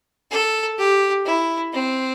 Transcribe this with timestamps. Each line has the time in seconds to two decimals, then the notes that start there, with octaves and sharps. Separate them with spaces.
0.31 A4
0.78 G4
1.26 E4
1.73 C4